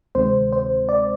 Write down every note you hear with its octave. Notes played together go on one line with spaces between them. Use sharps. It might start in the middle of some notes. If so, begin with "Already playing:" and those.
D2 C3 D#3 G#3 C4 C5
C5
D5